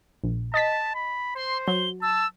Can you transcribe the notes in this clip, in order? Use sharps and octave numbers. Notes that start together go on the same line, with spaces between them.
A#1
D#5 A5 A6 B6
B5
C5 C6
F#3 G7
A5 E6